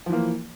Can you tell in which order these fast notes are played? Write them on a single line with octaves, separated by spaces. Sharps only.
F3 E3 A#3